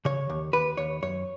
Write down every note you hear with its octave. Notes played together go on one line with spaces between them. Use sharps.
C#3 C#5
D#2
D#2 B4
D#2 C#5
F#2 C#5